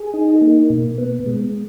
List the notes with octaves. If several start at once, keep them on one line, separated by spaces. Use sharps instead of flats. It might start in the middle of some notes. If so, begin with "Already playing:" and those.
Already playing: G#4
D#4
A#3
B2
B3
G#3